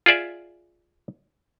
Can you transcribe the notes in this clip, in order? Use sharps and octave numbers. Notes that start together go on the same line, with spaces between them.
F4 G#4 D5 E5